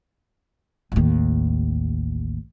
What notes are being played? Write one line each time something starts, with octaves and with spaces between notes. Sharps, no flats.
A1 D#2